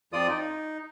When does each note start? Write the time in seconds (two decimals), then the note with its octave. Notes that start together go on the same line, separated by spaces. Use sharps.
0.13 F2 F3 F4 D5 D#6
0.29 D#4